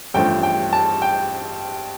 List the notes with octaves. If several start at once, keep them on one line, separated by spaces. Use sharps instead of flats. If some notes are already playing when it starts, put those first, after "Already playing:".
A1 G2 F3 A3 C4 G5
G5
A5
G5